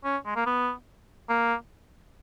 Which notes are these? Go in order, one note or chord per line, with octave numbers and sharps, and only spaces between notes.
C#4
G#3
A#3
B3
A#3